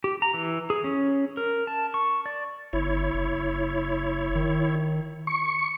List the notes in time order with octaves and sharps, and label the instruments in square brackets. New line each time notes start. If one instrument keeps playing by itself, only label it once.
[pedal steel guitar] G4
A#5
E3
G#4
C#4
A#4
A5
C#6
D5
[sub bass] G1 [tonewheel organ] E4 C#5
[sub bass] F#1
D#3
[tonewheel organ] C#6